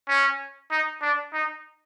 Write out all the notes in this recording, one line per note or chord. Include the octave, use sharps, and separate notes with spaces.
C#4
D#4
D4
D#4